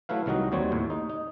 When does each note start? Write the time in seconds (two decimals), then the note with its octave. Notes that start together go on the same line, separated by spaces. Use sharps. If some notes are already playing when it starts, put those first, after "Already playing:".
0.09 F#3 A3 E4 B4 F5
0.26 C2 D#3 F#3 D#4 F#4
0.52 D#2 F#3 G3 C4 C#5
0.72 D#2 A2
0.90 D#4
1.10 D#4